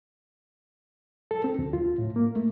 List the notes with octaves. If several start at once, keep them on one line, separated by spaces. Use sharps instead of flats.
A4
C4
D2
F4
A2
A#3
A3